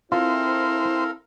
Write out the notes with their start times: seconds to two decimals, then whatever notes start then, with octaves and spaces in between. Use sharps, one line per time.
0.12 C4 E4 F4 A4 A#4 C5 F5